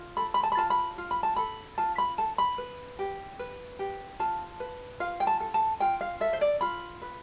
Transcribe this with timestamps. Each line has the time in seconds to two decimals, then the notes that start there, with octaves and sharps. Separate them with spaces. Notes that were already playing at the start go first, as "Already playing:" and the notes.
Already playing: F4
0.17 A4 B5
0.34 B5
0.43 A5
0.52 B5
0.57 F4 A5
0.70 B5
0.98 F4
1.11 B5
1.23 A5
1.36 A4 B5
1.78 F4 A5
1.98 B5
2.18 A4 A5
2.38 B5
2.58 B4
2.99 G4
3.39 B4
3.79 G4
4.19 F4 A5
4.60 B4
5.00 F4 F5
5.20 G5
5.27 A5
5.40 A4
5.54 A5
5.80 F4 G5
6.01 F5
6.21 A4 E5
6.33 C5
6.41 D5
6.61 F4 B5
7.02 B4